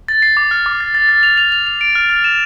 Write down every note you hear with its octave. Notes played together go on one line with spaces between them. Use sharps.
A6
C7
D6
F6
D6
A6
A6
A6
F7
F7
F7
F7
D7
F6
F6
E7